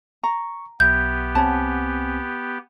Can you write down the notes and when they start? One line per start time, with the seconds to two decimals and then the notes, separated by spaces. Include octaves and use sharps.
0.24 A#5 C#6
0.80 B1 B3 G4 E5 G6
1.35 C2 C4 C#5 F#5 G#5 A5